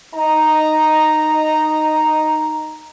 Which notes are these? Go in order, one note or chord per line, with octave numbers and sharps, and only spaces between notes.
D#4 D#5 A#5